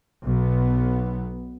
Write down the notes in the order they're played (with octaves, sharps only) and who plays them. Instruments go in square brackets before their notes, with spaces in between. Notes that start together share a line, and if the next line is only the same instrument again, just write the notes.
[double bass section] B1 B3